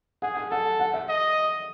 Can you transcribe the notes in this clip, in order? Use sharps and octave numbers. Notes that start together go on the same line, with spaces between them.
G#4 F#5
G#5
A4 F#5
F#5
E5
D#5